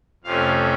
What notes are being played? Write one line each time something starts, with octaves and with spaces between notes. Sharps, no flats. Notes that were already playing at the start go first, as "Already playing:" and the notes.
F2 C3 F3 A3 C#4 F5